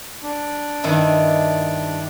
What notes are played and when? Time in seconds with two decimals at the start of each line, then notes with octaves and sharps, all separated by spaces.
0.23 D4
0.84 G2 D#3 E4